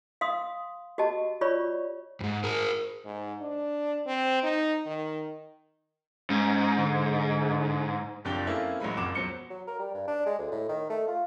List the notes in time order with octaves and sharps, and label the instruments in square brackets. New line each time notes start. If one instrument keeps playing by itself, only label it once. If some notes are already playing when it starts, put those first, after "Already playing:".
[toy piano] F5 C6 D#6
F#4 G4 D#5 A5
F4 C#5 D5 B5 C#6
[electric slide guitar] F2 G#2
G#4 A#4
[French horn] G#2
D4
C4
D#4
D#3
[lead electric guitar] G#2 [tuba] C#4
[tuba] D3
[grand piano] F#1 F2 D4 G4 G7
A#3 C4 C#4 E4 G#4 A4
A1 F#3 G#3 B5
F#1 F2 C#4 F#5 D6 E7
E2 B2 F#3 C5 C#7 G7
[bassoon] F#3
A#4
G3
G2
D4
G#3
D2
A2
D#3
A3
F4